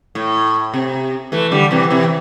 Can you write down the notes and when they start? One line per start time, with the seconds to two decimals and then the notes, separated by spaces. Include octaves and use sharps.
0.15 A2
0.74 C3
1.32 E3 A3
1.51 D3 G3
1.71 C3 E3
1.90 C3 E3